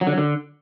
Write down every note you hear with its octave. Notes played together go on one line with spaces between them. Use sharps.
F#3
D3
F#3
D3